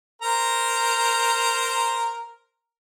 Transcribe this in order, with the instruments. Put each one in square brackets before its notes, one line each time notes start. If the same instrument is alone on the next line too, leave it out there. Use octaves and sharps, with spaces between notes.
[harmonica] A#4 C5 A#5